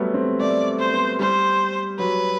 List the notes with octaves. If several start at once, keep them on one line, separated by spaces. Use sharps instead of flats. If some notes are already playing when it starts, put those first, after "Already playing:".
Already playing: F#3 G3 A3 B3
C4
A3 D5
C5
B3
G3 C5
F#3 B4